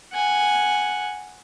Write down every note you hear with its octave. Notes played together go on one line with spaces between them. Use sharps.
F#5 G#5